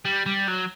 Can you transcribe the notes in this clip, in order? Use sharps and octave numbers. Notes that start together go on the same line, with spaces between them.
G3
G3
F#3